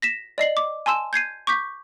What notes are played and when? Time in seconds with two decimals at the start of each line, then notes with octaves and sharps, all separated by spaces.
0.02 A#6 B6 E7
0.38 D5 D#5 C7 F#7
0.57 D6
0.86 G#5 A5 C6 E6 E7
1.13 G6 G#6 C7 D#7
1.47 C#6 D6 G6 B6